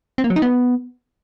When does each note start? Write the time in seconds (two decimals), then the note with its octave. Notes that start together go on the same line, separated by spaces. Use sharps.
0.18 C4
0.24 A#3
0.30 F#3
0.36 D#4
0.42 B3